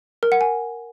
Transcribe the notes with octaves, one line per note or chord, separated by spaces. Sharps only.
A#4
F#5
G#5